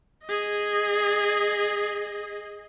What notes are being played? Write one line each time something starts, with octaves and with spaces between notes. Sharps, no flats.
G#4 D#5